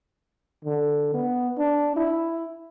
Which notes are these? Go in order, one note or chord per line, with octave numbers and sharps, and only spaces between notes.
D3
B3
D4
E4